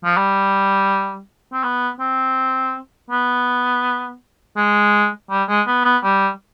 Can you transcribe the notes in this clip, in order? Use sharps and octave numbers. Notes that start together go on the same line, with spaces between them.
F3
G3
C4
B3
C4
B3
G#3
G3
G#3
B3
B3
G3